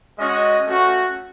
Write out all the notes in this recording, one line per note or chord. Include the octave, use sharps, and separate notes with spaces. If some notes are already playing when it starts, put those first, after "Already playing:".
G#3 C#4 F#4 D#5
A3 C#4 F#4